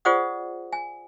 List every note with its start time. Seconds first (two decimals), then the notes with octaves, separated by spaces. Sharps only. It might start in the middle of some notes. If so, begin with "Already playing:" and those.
0.05 F4 G#4 C5 D5 F#5 D#6
0.73 G#5